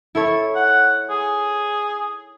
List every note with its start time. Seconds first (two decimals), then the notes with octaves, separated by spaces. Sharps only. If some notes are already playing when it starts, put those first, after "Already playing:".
0.15 E4 A4 C#5
0.55 F#5
1.10 G#4